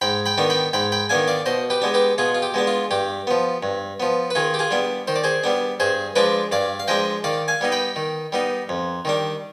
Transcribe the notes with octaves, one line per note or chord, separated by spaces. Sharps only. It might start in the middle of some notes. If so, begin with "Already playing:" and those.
G#2 G5 B5
G5 B5
D#3 B3 D4
G5 B5
G#2 G5 B5
G5 B5
D#3 B3 D4 F5 G#5
D5 F5
B2 C5 D#5
G4 B4
G#3 B3 D4
G4 B4
B2 F4 G#4
F4
G4
G#3 B3 D4
F4
G2 G4
F3 B3
G2
F3 B3
B4
D#3 F4 G#4
G4
F4 G#4
G3 B3 D4
D#3 C5
D5
G#4 C5
G3 B3 D4
G2 G#4 C5
F3 G#3 D4 B4 D5
G2 D5 F5
F5
F3 G#3 D4 D#5 G5
D#3 D5 F5
F5 G#5
G3 B3 D#4
G5 B5
D#3
G3 B3 D#4
F2
D#3 G3 D4